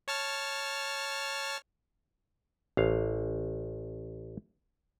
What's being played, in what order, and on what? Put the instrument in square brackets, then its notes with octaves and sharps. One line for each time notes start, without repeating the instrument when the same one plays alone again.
[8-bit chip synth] C#5 A5 F6
[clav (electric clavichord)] A1 F5